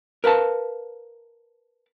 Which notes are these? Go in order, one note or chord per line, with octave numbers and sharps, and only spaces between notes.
A#4 B4 F5 A5